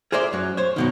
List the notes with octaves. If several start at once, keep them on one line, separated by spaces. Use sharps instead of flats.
G#4 A#4 C5 D5 E5
F#2 F#3
C5 C#5
F#2 B2 D#3